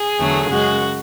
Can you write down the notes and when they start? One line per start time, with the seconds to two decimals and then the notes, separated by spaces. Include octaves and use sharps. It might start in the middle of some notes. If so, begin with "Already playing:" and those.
Already playing: G#4
0.19 E2 D3 F#3 A3
0.50 F#2 C#3 G#3 F#4